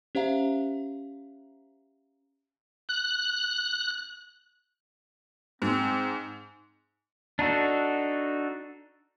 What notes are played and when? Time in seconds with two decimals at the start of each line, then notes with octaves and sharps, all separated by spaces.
0.15 C#4 G4 C5 E5 F5 A#5
2.89 F#6
5.62 G#2 C4
7.39 D4 D#4 F#4 A4